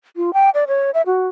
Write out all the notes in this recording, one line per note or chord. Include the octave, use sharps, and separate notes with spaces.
F4
G5
D5
C#5
E5
F#4